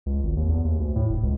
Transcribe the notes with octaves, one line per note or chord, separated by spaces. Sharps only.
C#2
G#1
D#2
E2
D#2
D2
A2
F1
C#2